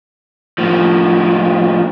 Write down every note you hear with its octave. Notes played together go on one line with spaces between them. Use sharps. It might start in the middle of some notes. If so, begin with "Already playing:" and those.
A2 F3